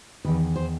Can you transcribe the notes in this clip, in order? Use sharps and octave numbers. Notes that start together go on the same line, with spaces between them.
E2 D#3 B4
C5